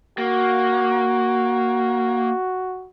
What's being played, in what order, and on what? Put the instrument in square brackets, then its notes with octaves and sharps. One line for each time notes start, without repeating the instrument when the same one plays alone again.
[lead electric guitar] A#3 [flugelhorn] F#4